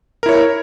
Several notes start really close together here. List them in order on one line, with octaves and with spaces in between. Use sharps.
A#4 E4 C#5